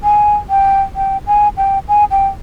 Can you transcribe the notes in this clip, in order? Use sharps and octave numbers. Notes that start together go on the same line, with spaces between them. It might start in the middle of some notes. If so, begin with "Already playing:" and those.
G#5
G5
G5
G#5
G5
G#5
G5